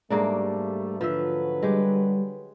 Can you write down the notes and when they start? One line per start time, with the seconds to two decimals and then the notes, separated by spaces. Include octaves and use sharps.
0.10 G#2 G3 A3 A#3 D4
1.01 D3 F3 F#3 B4 E5
1.62 G3 G#3 G4